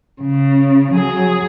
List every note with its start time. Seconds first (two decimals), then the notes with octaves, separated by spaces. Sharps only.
0.22 C#3
0.92 F#3 G#4